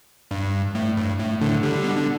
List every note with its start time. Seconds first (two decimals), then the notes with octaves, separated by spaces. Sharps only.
0.31 G2
0.75 A2
0.97 G2
1.19 A2
1.41 A2 D3
1.63 D3 G3
1.84 B2
1.95 D3